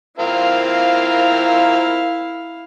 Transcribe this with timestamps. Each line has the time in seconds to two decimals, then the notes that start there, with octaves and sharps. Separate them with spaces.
0.19 C4 E4 F4 A#4 F5